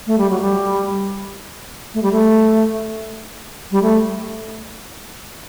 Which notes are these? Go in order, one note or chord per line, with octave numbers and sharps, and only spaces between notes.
A3
G3
F#3
G3
A3
G3
A3
G3
A3